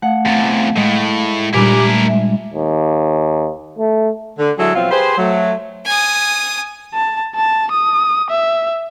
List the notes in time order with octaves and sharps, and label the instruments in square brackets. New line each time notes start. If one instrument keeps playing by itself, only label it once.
[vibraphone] A3 F5 [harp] F#5
[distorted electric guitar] E2 C3 [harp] G#5 A6
[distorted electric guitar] A2 [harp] G#3
[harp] A#2 G3 D4 [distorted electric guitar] E4 A#4 [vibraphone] G4 G#5 D6
[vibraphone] A3
G#3 E5
[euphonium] D#2
A3
[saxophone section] D3
D3 F#3 G#3 E4 G#4 A4
B2 F3 F#3 C4 F4
G4 G#4 B4 C5
F#3 A3
[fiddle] G#5 D#6
[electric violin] A5
A5
D#6
E5